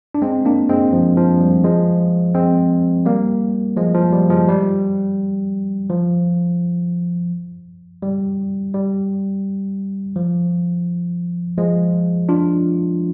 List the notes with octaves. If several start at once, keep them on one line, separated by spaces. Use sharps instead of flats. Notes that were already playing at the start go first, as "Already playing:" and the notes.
D4
G#3 C4
A#3 D4
G#3 C4
F3
F3
G3
F3 G#3
G#3 C4
G3 A#3
F3 G#3
F3
G3
F3 G#3
G3
F3
G3
G3
F3
F3 G#3
D4 F4